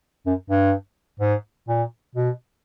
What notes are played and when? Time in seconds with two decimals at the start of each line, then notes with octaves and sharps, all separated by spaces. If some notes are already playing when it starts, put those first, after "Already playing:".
0.26 F#2
0.50 G2
1.20 G#2
1.68 A#2
2.15 B2